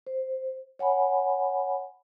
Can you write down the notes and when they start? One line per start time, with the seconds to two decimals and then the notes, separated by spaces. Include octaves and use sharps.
0.07 C5
0.79 C#5 F#5 G#5 B5